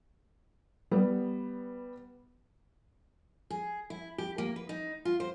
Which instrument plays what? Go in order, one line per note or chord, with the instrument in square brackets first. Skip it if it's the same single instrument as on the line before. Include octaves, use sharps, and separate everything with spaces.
[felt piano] G3 B3
[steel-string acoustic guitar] G#4
E4
G4
A#3
B4
D#4
F4
C5